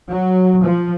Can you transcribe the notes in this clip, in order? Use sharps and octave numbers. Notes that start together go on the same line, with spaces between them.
F#3
F3